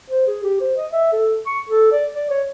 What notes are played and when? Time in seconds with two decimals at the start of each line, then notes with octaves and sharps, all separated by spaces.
0.10 C5
0.27 G#4
0.44 G4
0.61 C5
0.77 D#5
0.92 E5
1.12 A4
1.46 C#6
1.69 A4
1.92 D5
2.15 D5
2.31 C#5